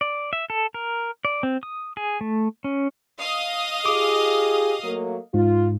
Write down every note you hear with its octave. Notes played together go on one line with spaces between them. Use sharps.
D5
E5
A4
A#4
D5
C4
D#6
G#4
A3
C#4
D#5 F5 D#6
F4 G4 G#4 D6
F#3 A3 A#3
G#2 F4